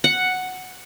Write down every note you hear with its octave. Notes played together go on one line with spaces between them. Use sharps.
F#5